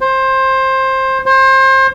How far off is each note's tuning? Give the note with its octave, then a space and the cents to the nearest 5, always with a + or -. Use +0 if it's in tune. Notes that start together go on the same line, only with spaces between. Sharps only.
C5 +20
C5 +30